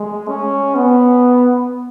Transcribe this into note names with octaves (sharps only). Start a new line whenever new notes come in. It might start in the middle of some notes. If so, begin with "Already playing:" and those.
Already playing: G#3
C#4
B3